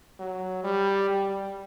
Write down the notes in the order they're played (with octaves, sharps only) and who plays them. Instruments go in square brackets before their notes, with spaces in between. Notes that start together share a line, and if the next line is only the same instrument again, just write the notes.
[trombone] F#3
G3
G3